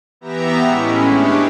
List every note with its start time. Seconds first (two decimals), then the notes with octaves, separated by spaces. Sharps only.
0.21 E3 B3 G4 E5 A#5
0.63 A2 G#3 C#4 E4
1.07 D4 G4 G#4 B4 C#5